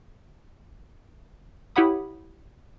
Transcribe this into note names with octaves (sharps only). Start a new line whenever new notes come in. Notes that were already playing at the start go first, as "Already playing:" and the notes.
E4 G4 C#5 F#5 B5 D#6